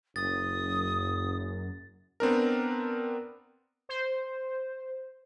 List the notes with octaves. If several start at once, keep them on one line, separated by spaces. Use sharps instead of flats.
F#1 F#2 D#6 A6
B3 C4 D4 A#4
C5